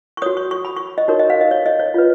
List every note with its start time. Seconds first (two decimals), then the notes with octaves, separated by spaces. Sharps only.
0.17 C#6
0.22 F#4 C#5 D#6
0.37 C#6
0.51 C#6
0.65 B5
0.77 C#6
0.98 D#5
1.08 D#4 F#4 A#4 C#5
1.20 D#5
1.30 F5
1.41 D#5
1.51 C#5
1.66 D#5
1.80 C#5
1.94 F4 B4